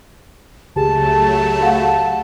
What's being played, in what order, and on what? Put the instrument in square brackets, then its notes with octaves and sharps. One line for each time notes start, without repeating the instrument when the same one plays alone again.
[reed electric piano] C#2 G4 G#4 [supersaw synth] F#3 A3 [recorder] A5
[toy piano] F#4 F5 F#5